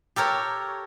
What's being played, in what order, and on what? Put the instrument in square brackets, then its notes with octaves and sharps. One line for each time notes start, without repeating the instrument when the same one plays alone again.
[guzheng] G4 A4 A#4 C#5